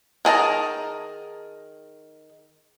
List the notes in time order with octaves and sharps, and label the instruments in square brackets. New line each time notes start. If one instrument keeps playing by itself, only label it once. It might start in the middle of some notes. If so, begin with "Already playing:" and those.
[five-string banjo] D#3 G#4 A5 A#5